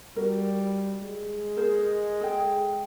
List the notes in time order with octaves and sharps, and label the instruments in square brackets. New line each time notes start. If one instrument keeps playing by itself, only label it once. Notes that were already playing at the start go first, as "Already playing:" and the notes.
[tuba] G3 [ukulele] F#4 A#4
[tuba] G#3
[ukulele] G#4 A#4 C5
G#4 A4 G5